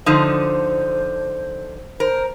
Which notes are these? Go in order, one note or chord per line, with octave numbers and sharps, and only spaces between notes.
D3 F3 D#4 C5
A#4 C5